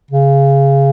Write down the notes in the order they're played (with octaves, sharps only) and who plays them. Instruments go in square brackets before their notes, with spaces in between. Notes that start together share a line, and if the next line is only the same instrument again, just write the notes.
[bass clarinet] C#3